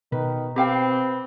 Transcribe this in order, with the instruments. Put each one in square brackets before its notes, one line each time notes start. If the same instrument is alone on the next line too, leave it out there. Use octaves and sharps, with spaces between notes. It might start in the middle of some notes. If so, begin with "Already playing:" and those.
[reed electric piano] B2 [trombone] D#3 [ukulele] B4
[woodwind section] C4 [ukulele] G4 F5 G5 [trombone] B4